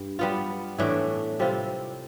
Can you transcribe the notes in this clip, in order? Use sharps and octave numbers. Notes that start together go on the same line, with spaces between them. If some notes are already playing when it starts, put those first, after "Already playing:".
Already playing: G2
G3 B3 F4
A2 E3 A3 D4
C3 G3 C4 F4